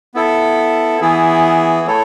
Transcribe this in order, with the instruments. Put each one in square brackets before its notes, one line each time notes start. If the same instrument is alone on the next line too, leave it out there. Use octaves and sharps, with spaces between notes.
[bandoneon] B3 E4 A4
E3 B3 E4 G#4
A3 E4 A4 C#5